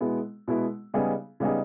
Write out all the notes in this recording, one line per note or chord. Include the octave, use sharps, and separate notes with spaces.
B2 G#3 B3 E4
B2 G#3 B3 E4
C#3 G3 B3 D#4 G#4
C#3 G3 B3 D#4 G#4